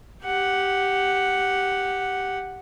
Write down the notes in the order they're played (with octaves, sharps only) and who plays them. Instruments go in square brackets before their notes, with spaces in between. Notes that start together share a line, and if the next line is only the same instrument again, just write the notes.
[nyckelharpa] G4 F#5